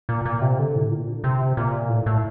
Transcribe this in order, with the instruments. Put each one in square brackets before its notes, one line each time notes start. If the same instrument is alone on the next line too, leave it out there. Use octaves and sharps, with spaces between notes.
[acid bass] A#2
A#2
C3
D3
A2
A#2
D3
C3
A#2
A2
A2